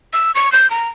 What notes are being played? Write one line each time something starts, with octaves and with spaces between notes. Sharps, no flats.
E6
C#6
G6
A#5